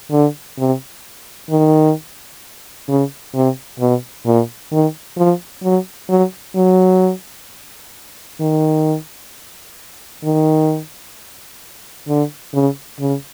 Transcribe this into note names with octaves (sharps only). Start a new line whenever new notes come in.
D3
C3
D#3
C#3
C3
B2
A#2
D#3
F3
F#3
F#3
F#3
D#3
D#3
D3
C#3
C#3